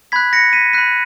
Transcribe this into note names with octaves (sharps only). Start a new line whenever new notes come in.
B5 F#6 G#6 B6
A#6 C#7
B6 D#7
B5 F#6 B6 D#7